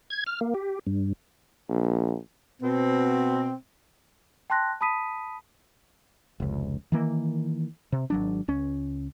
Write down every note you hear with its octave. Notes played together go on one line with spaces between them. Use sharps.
G#6
F6
A#3
G4
G2
A#1
B2 C4
G5 A5 C6 F#6 A#6
A5 B5 D#6 B6 D#7
F1 C#2
D#3 E3 A#3
C3
G#1 F#3 D4
C#2 C#4